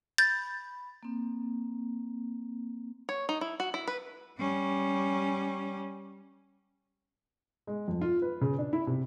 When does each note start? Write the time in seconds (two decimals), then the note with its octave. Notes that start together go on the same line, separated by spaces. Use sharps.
0.18 B5 G6 A6
1.03 A#3 C4
3.09 C#5
3.29 D#4
3.41 E4
3.60 F#4
3.74 E4
3.87 B4
4.38 G3 C#4
7.67 G#3
7.88 F2
8.01 F4
8.22 B4
8.41 C#3
8.58 D4
8.73 E4
8.87 C3